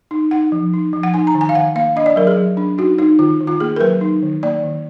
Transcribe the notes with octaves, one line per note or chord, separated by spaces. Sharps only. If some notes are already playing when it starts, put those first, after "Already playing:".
D#4
D#4 F#5
F3
D#4
F3
F#5
D#4 G#5
A#5
D#3
G#5
F5
D#3 F#5
A#3 F5
D4 D#5
D5
F#3 A#4
G#4
F#3
D4
D#4 F#4
D#4
D#3 F4
D#3
F4
A#3 G#4
A#4
F#3 B4
D#4
D#3
A#3 D5
D#3